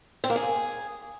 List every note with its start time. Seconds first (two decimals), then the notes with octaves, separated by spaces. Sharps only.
0.24 C4
0.30 A#3
0.36 G#4